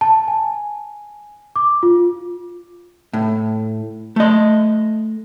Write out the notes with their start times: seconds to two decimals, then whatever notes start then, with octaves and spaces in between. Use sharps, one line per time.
0.01 A5
0.28 G#5
1.56 D6
1.83 F4
3.13 A2
4.16 A3 D#5